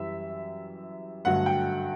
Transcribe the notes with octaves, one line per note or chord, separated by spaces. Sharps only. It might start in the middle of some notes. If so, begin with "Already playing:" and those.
Already playing: F#2 E3 G3 E5
G2 D3 F#3 A3 F#5
G5